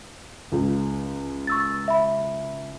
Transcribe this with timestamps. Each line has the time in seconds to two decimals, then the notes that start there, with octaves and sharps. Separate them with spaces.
0.52 C#2
1.47 C#6 E6 A6
1.88 E5 B5